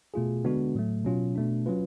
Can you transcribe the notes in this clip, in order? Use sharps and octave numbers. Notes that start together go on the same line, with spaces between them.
B2 A3 F4 G#4
D3 G#3 B3 D4 F#4
A2 F#3 A3
B2 F#3 C#4 F4
B2 A3 D4
F#3 C#4 F4 B4